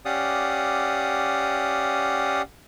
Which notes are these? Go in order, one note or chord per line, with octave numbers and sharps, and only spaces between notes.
C#4 G4 D5 F5 F#5 D#6